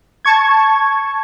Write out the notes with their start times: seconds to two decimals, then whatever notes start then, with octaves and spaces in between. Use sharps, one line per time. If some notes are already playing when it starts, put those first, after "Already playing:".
0.25 A5 C#6 G#6